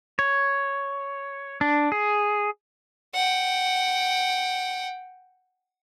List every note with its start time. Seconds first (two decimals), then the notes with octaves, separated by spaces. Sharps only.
0.19 C#5
1.61 D4
1.92 G#4
3.14 F#5 G5